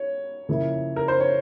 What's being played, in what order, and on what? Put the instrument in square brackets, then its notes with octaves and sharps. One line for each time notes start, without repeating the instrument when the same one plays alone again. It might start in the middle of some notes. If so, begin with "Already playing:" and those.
Already playing: [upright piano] C#5
[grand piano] C#3 F3 A#3 E4
[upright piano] A#4
C5
C#5